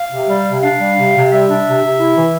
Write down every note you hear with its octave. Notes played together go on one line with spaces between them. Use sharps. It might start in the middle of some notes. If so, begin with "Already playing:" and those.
Already playing: F5
C3
G3
C3
D4 F5
G3
C3
C3
G3 E5
D4
C3
C3
E4
E3